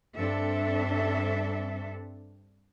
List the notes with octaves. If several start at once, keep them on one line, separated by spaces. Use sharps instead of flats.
G2 C4 D4 A4 E5